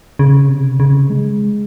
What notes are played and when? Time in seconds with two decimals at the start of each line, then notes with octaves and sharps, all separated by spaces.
0.19 C#3
0.49 C3
0.80 C#3
1.10 G#3